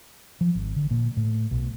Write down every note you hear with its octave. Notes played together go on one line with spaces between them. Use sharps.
F3
G#1
D3
A#2
A2
B1